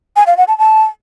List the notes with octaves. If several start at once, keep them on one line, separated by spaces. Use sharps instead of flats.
G#5
F5
F#5
A5
A5